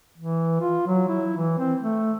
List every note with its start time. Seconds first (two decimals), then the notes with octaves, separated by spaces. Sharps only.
0.18 E3
0.61 F4
0.87 F#3
1.08 E4
1.37 E3
1.59 C4
1.80 A3